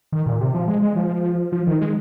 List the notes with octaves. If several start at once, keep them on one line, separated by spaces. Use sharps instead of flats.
D#3
A#2
C3
F3
G#3
G#3
F3
F3
D#3
G#3